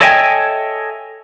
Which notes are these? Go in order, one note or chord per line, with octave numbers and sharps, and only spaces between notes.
A4 C#5 D#5 E5 G5 G#5